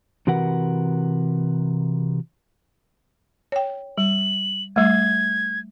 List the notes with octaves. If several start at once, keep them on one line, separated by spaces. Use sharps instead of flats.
C3 E3 F#4 A#4 B4 F#5
C#5 G5
G3 F#7
G3 A3 G#6